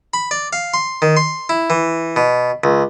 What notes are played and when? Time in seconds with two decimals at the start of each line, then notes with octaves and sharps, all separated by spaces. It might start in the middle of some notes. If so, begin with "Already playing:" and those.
0.13 B5
0.31 D5
0.53 F5
0.74 C6
1.02 D#3
1.17 C6
1.49 E4
1.70 E3
2.16 B2
2.64 C#2